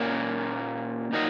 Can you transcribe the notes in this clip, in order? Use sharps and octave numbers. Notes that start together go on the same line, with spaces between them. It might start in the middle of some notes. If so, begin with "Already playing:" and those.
Already playing: A#2 A#3 C#4 A#4
A#2 F#3 D#4 A#4 D#5